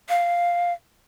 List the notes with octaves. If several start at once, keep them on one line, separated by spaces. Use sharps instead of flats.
F5